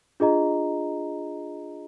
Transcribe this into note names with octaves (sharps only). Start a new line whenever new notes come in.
D4 F4 G#4 D#5 A#5